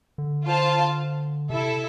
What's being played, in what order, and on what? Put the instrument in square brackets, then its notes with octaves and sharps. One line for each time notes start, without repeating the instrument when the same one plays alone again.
[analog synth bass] D3
[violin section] F4 C5 F5 A5
[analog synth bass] C3 [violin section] E4 A4 E5